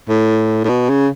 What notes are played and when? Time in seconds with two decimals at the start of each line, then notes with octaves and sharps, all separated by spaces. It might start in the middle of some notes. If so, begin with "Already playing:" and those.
0.09 A2
0.65 A2
0.69 B2
0.89 C#3